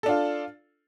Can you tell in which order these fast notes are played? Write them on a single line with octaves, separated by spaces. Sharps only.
A4 D4 F4